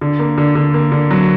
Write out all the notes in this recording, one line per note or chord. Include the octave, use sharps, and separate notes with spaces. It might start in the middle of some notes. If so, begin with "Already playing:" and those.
D3
A#3
D3
D3
A#3
D3
F#3